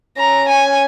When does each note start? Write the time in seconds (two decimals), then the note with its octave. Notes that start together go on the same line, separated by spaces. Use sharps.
0.17 C#4 A#5
0.48 G#5